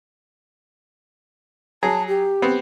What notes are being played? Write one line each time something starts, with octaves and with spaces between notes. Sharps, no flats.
F#3 G#4 A5
G4
B3 C4